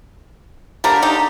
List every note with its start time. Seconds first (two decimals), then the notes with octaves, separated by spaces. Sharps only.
0.84 D3 G3 A#3 G4 A#4
1.02 D#4 G4